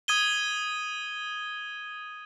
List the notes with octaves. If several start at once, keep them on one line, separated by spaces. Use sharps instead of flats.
D#6 G#6 D#7 G7